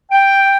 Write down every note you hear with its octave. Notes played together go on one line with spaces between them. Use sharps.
G5